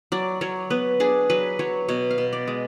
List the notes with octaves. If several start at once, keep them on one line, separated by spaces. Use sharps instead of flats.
F#3 D5
F#3 C#5
B3 B4
D4 G#4
F#3 B4
F#3 C#5
B2 C#5
F5
B2
D5
G#3